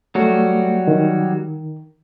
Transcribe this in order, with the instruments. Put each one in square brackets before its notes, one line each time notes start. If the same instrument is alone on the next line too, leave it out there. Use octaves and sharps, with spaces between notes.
[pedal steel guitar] F#3 G3 F#4 [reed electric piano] A3
[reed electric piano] D#3